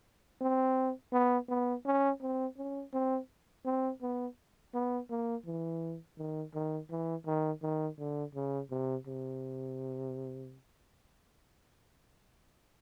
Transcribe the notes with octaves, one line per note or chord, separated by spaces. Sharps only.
C4
B3
B3
C#4
C4
C#4
C4
C4
B3
B3
A#3
E3
D#3
D#3
E3
D#3
D#3
D3
C#3
C3
C3